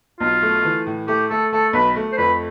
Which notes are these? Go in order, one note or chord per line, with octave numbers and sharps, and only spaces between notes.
B1 F4
A3
E3
A2
A3 G4
A3 A4
A3 A4
B1 B4
A3
C5
F2 B4